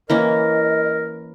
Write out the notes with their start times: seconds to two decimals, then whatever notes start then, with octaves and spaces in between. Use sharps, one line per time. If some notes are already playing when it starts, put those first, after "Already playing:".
0.10 E3 A#3 C#4 A#4 D#5